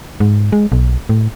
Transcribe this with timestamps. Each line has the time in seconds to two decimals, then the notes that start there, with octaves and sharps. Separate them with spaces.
0.20 G#2
0.52 G#3
0.72 B1
1.09 A2